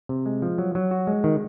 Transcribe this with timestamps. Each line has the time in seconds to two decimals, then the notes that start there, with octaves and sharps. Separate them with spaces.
0.09 C3
0.26 G#3
0.42 F3
0.58 F#3
0.75 F#3
0.91 F#4
1.07 G#3
1.24 D#3